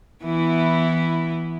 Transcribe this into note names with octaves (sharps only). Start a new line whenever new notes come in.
E3 B3 E4